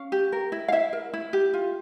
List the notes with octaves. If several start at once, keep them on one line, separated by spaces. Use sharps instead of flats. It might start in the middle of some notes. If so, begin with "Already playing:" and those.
Already playing: C#4 F5
G4
A#4
E4
F5
E4 E5
A#4
E4
G4
F4